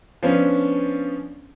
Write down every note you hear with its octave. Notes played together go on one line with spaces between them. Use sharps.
F3 B3 C#4 D4